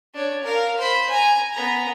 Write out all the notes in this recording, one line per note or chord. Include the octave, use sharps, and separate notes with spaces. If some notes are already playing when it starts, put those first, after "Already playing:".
D4 C#5
A#4 F5
C5 B5
G#5 A#5
B3 A#5